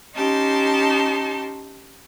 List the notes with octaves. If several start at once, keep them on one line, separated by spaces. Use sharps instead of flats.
C#4 D#4 G4 A5 C6